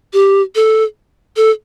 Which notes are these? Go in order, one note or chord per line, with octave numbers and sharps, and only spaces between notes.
G4
A4
A4